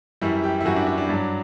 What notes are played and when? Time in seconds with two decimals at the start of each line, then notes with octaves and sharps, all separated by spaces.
0.21 F#2 E3 G3 E4
0.44 G4
0.61 E4
0.65 F#2 E3 G3 F#4
0.76 D4
0.87 D4
0.98 D4
1.09 G2 F#3